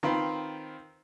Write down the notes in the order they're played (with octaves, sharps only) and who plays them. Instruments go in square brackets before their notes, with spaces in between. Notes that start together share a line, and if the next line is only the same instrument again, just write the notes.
[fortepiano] D#3 C4 F4 B4 C5